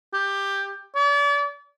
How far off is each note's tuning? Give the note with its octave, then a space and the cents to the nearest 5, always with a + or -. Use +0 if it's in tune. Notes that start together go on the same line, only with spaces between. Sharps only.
G4 +10
D5 -40